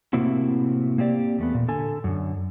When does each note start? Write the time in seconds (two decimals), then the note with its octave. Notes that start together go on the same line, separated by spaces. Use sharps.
0.13 A2 C3 A#3 C4 E4 F#4
0.98 A#3 C4 G4 D5
1.39 E2 A3 B3
1.55 A#2
1.68 D3 A4 G#5
2.04 F#2 D3